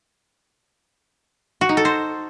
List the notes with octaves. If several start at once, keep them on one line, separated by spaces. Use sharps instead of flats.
F#4
D#4
A4
C5